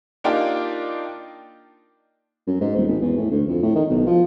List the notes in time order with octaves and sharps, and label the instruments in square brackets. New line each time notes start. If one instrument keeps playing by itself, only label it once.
[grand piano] A#3 D4 D#4 F4 G4
[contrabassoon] F#2
G#2
D#1
G#1
E2
A2
D2
F2
A2
D#3
B1
F3